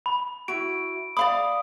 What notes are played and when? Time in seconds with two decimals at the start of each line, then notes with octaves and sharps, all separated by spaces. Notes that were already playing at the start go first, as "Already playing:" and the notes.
0.06 B5
0.48 E4 F#4 D7
1.17 D5 F5 B5 D#6